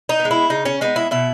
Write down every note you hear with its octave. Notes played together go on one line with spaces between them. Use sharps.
D#4
B3
G#3
E4
C#3 D#4
C#4
G#3 B3 D#4
E4
B2 E4